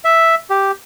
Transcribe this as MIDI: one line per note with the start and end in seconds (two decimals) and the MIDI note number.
0.05 0.35 76
0.50 0.71 67